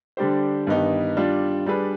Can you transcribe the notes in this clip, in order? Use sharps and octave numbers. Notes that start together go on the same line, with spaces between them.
D3 G3 D4 G4 C5
G2 D#3 B3 D#4 G4
G3 D4 F4
G3 D4 G#4 B4